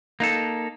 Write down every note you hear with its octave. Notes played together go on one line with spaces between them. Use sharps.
A#3 D#4 A4